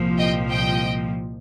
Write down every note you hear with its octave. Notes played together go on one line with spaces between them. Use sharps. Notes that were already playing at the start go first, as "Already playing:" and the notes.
Already playing: C2 A#2 F3
D#5 G5
D#5 G5